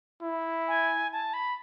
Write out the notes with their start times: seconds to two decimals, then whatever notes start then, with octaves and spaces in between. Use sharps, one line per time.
0.22 E4
0.68 G#5
1.12 A5
1.34 B5